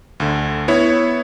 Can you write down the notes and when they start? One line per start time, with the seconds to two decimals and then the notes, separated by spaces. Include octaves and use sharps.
0.20 D2 D3
0.68 B3 E4 C#5